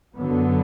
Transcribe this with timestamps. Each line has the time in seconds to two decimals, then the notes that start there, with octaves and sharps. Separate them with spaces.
0.16 F#2 D3 F#3 B3